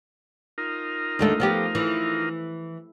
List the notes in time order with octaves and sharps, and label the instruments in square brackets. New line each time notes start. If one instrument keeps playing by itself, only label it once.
[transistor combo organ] D#4 F4 A#4
[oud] D#2 D3 A3
F3 B3 G4
E3